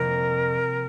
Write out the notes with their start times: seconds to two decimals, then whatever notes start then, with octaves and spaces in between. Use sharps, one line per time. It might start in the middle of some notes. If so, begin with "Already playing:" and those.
Already playing: F2 C3 F3 A#3 A#4